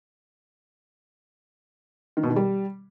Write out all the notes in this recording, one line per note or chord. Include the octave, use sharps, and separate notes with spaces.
D#3
B2
D#3
G3